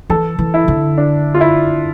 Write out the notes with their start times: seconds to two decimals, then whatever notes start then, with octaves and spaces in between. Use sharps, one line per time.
0.10 E3 A4
0.39 E3
0.54 E4
0.68 D3
0.98 D4
1.34 F4
1.41 E4